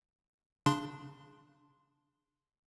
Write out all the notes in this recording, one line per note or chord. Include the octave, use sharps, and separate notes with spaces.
C#3 D4 C6